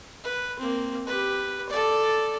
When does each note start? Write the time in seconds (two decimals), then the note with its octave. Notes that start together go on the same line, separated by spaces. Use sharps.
0.23 B4
0.59 A#3 C4
1.07 G4 B4
1.69 A4 D5